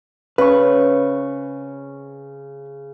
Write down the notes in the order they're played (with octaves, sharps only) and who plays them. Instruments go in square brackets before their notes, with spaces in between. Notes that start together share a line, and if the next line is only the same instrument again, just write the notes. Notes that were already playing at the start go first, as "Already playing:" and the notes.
[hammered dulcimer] C#3 C#6 [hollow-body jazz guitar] B4